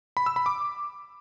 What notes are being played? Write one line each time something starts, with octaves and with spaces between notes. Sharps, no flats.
B5
E6
B5
D6